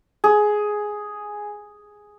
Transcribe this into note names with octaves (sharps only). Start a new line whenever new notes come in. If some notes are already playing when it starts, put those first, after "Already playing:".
G#4